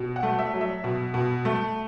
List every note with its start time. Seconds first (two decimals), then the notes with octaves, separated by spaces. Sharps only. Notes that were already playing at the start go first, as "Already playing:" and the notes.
Already playing: B2
0.16 F#5
0.23 A3
0.39 E5
0.54 F#3
0.61 E5
0.84 B2
1.14 B2
1.45 A3